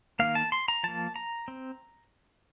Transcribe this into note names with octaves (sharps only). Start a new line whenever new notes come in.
D#3 A#3 F5
A5
C6
A#5
F3 A#3 A5
A#5
C4